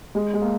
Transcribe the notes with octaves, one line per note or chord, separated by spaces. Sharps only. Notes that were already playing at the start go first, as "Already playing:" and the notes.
G#3
G#3
A#3